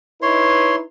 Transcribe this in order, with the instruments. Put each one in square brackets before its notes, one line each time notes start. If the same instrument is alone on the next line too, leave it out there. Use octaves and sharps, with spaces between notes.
[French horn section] D#4 E4 B4 [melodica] C#5 C6